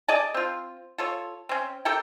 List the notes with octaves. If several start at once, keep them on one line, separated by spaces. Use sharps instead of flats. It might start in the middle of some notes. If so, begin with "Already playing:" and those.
G#4 D5 D#5 A5
C4 F4
F4 A4 C#5
C4 C#4
G4 A4 A#4 G5